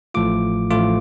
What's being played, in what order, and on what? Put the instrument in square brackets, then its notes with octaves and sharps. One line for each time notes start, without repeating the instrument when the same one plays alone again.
[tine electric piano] A1 A2 F3 A3 F4 D6
A1 A2 F3 A3 F4 D6